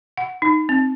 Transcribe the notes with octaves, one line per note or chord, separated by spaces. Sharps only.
F#5
D#4
C4